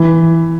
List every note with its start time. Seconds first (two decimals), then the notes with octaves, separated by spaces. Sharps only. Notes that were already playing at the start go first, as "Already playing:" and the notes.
Already playing: E3